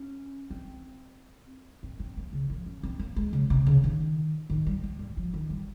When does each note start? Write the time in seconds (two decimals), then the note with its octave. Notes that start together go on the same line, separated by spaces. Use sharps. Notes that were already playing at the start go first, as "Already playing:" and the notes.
Already playing: C#4
0.51 C4
1.83 C4
2.00 C4
2.17 A#3
2.33 C#3
2.50 F3
2.66 C#4
2.83 C4
3.00 A#3
3.16 G#3
3.33 C#3
3.50 C3
3.67 C#3
3.84 D#3
4.50 D#3
4.67 G3
4.84 G3
4.99 G3
5.17 F3
5.34 D#3
5.50 G3